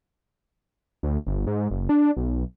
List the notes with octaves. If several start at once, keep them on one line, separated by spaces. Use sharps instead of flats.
D2
G1
G#2
F#1
D4
B1